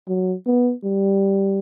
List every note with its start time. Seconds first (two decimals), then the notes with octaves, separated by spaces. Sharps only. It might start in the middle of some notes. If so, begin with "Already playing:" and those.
0.08 F#3
0.46 B3
0.84 G3